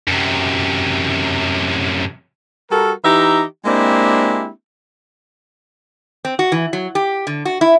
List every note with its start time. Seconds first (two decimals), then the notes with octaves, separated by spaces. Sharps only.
0.08 F#2 C3
2.70 G3 F#4 A4 A#4
3.04 E3 D#4 G4 E5 A#5
3.65 G#3 A#3 C4 D4 E4 G4
6.25 C4
6.39 F#4
6.52 E3
6.73 F#3
6.95 G4
7.27 D3
7.45 F#4
7.61 E4